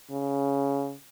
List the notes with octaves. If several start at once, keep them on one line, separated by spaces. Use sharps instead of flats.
C#3